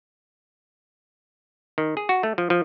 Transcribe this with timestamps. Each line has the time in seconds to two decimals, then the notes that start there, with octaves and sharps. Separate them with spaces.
1.78 D#3
1.97 G#4
2.09 F#4
2.23 A3
2.38 F3
2.50 F3